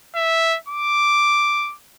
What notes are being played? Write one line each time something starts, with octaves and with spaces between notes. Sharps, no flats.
E5
D6